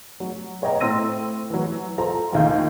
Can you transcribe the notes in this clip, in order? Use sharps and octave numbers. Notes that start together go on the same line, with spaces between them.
F#3
B4 C#5 D#5 G5 A#5
A2 C4 C6 E6 A#6 D#7
E3 F#3
F4 A4 C5 A#5
A#1 D#2 G6